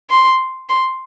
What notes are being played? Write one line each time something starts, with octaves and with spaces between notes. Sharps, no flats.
C6
C6